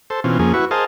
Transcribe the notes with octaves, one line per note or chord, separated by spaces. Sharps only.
A4 C5
B2 E3 C4 C#4 F4
F2 F3 A#3 C#4 G#4
E4 F#4 B4 C#6
G#4 A#4 C5 D#5 F5 A5